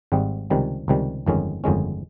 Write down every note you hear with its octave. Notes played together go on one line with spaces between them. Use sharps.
G#1 G#2 G3 C4
C#2 C3 D#3 G3
C#2 C3 D#3 G3
G1 F2 D#3 G#3 C#4
G1 F2 D#3 G#3 C#4